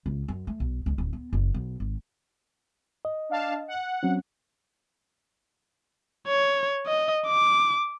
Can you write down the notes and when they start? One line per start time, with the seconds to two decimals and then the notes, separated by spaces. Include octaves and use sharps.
0.06 C#2
0.28 F#2
0.47 A3
0.60 B1
0.86 C#2
0.98 D1
1.13 B3
1.33 F#1
1.54 B1
1.80 G#1
3.05 D#5
3.29 D4 F5 A5
3.68 F#5
4.03 F#3 C4 C#4
6.27 C#5
6.86 D#5
7.27 D6